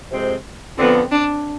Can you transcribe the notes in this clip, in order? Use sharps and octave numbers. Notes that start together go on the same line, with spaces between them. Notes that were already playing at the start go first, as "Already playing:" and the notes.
F2 C3 G#3 C4
F2 D3 F3 B3 C4
D4